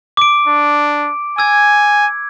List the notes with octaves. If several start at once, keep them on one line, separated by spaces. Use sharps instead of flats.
D6 D7
D4
G#5 E6 G#6